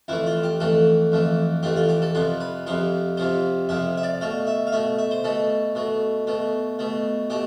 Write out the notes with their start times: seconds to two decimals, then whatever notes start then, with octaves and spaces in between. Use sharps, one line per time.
0.08 F2 E3 A3 E4
0.26 F4
0.43 G4
0.60 F2 E3 A3 A4
1.12 F2 E3 A3
1.63 F2 E3 A3 G4
1.76 F4
1.89 G4
2.02 A4
2.15 F2 C3 F3 B4
2.41 B4
2.67 F2 C3 F3 B4
3.17 F2 C3 F3 C5
3.69 F2 C3 F3 E5
3.97 E5
4.03 D5
4.21 B2 A3 F5
4.47 E5
4.67 F5
4.72 B2 A3 E5
4.99 E5
5.11 C5
5.24 B2 A3 A4
5.75 B2 A3
6.27 B2 A3
6.79 B2 A3
7.30 B2 A3 G4